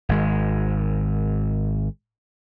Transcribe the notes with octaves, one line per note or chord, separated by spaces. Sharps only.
G#1 G#3